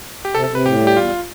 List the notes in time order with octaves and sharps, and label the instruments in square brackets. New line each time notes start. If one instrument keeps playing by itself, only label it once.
[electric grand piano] G4
[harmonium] C3 [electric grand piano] A4
[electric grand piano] A4
[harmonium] C3
[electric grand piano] B4
[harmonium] A2 [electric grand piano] G4
[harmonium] G3
[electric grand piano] G4
[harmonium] E2 [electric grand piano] F4